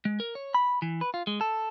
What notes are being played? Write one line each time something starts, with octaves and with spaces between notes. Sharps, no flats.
G#3
A#4
C#5
B5
E3
B4
F4
G#3
A4